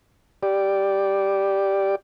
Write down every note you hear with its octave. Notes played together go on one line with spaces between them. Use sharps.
G4 D5